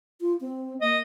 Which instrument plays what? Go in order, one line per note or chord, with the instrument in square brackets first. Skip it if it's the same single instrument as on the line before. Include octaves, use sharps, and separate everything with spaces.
[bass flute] F4
C4
[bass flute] A#3 [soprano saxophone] D#5